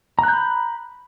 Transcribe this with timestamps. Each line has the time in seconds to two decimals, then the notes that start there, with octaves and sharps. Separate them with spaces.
0.19 A#5
0.23 F#6
0.28 G6
0.33 B5